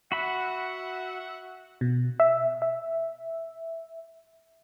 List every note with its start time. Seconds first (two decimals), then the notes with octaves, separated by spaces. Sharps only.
0.12 F#4 E5 F#5 B5
1.81 B2
2.20 E5
2.62 E5